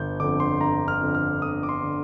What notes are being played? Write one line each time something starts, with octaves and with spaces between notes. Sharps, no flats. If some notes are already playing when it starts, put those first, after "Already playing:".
Already playing: G1 G6
F2 D3 D6
C6
G1 A#5
F6
F2 D3
F6
G1 D#6
D6
C6
D3